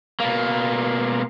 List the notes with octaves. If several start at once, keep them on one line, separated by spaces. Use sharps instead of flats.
B2 A#3